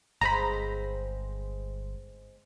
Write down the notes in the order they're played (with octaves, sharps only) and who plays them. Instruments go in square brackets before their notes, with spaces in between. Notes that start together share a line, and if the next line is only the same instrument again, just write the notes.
[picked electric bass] G1 [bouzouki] G#3 C4 C5 [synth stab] A#5 B5